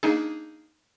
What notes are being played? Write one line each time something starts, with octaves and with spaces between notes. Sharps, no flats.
A#3 D4 D#4 G#4